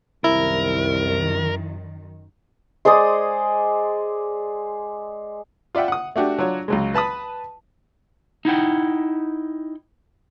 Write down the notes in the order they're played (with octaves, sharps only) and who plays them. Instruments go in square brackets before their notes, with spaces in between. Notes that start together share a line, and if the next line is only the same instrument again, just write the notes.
[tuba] C2 [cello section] F#2 D#3 [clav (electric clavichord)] E4 [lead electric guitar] A#4
[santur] G#3 C5 D5 D#6
[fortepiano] F4 D5 E5 F#5 G5
F#5 D#6
A3 D4 F#4 G4
F#3 D4 F4 F#4 C#5
C#2 F#3 G#3
B4 A5 B5 D#6
[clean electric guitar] D#4 E4 F#5 G5